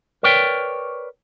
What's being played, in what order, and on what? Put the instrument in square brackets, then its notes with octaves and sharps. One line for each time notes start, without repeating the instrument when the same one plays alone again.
[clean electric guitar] A#4 B4 C#5 D5 G5